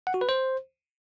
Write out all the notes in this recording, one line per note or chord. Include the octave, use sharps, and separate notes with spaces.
F#5
F#4
B4
C5